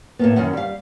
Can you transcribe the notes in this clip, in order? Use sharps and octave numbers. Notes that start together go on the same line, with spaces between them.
A2 A#3 B3
F#2 D#3 F#5
G3 F5